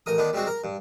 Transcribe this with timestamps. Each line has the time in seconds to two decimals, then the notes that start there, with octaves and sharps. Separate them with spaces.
0.06 A1 A#4 D#6
0.18 D#3 B3 D4
0.33 G3 G#3 C4 F#4
0.47 A#4
0.64 G2